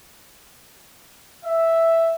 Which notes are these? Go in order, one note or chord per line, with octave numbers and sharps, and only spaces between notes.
E5